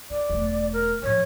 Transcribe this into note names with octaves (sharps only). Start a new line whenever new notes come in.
E4 D5
E1 A3
A#4
A2 F3 C#5